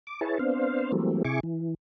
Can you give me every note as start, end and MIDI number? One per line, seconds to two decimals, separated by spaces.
0.07 0.20 86
0.21 0.38 64
0.21 0.38 68
0.21 0.38 71
0.21 0.38 73
0.21 0.38 81
0.39 0.92 59
0.39 0.92 60
0.39 0.92 62
0.39 0.92 72
0.39 0.92 77
0.92 1.23 52
0.92 1.23 54
0.92 1.23 55
0.92 1.23 57
0.92 1.23 58
0.92 1.23 60
1.25 1.40 48
1.25 1.40 64
1.25 1.40 68
1.25 1.40 85
1.25 1.40 86
1.43 1.74 52